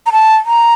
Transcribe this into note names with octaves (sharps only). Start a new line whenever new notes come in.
A#5
A5
A#5